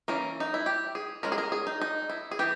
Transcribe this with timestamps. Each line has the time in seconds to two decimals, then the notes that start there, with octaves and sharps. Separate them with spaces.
0.08 E3 A#3 C#4 A#4
0.40 D#4
0.54 E4
0.66 G4
0.95 G#4
1.23 G#3 C#4 A#4
1.32 G#4
1.38 A#4
1.52 G#4
1.67 D#4
1.81 D#4
2.10 E4
2.31 G#4
2.39 E3 G4